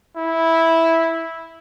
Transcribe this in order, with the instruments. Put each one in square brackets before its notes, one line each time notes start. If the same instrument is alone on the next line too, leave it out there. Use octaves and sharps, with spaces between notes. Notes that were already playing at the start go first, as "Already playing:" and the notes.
[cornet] E4